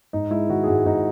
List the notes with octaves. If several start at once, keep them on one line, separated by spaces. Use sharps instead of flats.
G#2 D#4
G#3 E4
D#3 F#4
G#4
G#2 F#4
G#2 D#4